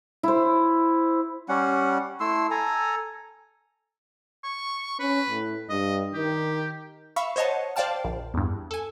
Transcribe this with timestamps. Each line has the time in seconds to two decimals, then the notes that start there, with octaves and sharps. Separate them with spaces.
0.23 E4 C5
1.49 G3 C#4 F#5
2.20 A3 E4 C6 E6
2.51 A4 G#5 A#5
4.44 C#6
4.99 C#4 B4
5.29 A2
5.70 G2 D#5
6.14 D#3 G4
7.16 E5 F5 B5 C#6
7.36 C5 C#5 D#5 F#5 A5
7.76 C5 D5 F5 G5 A5 F6
8.05 A#1
8.34 E2 G2
8.71 A4 G#5